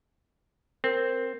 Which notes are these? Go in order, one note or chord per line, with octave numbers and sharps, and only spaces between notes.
C4 A#4